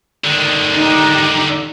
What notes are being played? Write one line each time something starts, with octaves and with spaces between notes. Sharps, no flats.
D3 D#3
D#4 G4